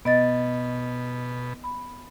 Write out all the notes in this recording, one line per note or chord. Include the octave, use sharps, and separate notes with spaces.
B2 B3 D#5 A6
B5